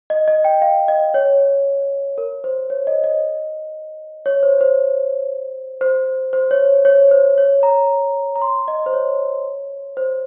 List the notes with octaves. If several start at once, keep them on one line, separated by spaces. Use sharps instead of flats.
D#5
D#5
G5
F5
D#5
C#5
A#4
C5
C#5
D#5
D#5
C#5
C5
C5
C5
C5
C#5
C#5
C5
C#5
A#5
A#5
C6
D#5
C5
C#5
C5